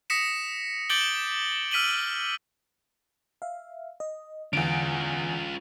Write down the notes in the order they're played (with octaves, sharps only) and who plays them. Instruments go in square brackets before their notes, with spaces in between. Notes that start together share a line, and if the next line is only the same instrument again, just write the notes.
[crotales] D#6 A#6 B6 C#7 E7
D6 G6 A6 D7 F#7 G7
E6 F6 B6 D#7 F#7 G7
[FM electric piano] E5 F5
D#5
[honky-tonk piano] E2 D7 [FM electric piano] D3 [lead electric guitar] C#4 F4